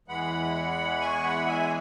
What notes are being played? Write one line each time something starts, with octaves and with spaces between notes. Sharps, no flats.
E2 E3 G#3 F#5 B5
G#5 C#6
F#5 B5
E5 G#5